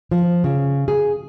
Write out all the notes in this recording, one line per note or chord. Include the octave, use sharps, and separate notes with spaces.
F3
C#3
G#4